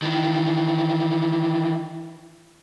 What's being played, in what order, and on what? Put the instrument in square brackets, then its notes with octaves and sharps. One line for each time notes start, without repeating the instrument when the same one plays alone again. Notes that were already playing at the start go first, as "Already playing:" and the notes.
[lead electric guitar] D#3 E3